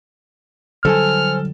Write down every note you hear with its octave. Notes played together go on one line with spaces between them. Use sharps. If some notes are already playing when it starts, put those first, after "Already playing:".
D3 F#3 G3 A4 C5 G#5 F6